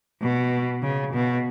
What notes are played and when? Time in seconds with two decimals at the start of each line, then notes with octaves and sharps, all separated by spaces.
0.22 B2
0.82 C#3
1.13 B2